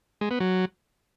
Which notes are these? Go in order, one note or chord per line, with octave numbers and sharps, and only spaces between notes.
G#3
B3
F#3